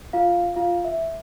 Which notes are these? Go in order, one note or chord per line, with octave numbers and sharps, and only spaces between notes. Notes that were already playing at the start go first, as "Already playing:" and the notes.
F4 F5
F4 F5
E5